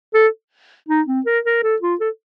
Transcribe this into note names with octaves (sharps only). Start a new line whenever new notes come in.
A4
D#4
C4
A#4
A#4
A4
F4
A4